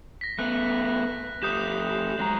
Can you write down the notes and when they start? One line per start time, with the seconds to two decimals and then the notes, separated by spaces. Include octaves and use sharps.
0.21 A#6 B6
0.39 A3 B3 F#6
1.43 A3 G4 D#6 G6 E7
2.19 F#3 G#3 A#5